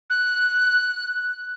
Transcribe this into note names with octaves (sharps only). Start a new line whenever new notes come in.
F#6